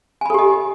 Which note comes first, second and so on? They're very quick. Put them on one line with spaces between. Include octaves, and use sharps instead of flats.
G#5 B5 A4 G4 D#5